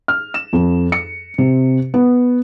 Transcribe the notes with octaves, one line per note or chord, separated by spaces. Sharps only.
F6
E7
F2
C#7
C3
B3